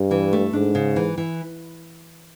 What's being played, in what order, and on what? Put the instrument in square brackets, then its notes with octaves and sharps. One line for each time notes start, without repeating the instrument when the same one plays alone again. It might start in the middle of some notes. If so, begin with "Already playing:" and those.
Already playing: [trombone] G2
[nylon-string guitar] E3
A3
[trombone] G#2 [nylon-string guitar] D4
[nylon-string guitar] C#3
E3
E3